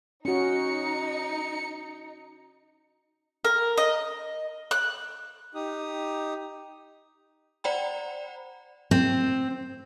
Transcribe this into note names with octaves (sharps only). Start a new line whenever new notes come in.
C#4 D#4 F#4 C#7
A#4
D#5
F#6
D#4 G4 D#6
C5 D5 F#5 G5 A#5 B5
C4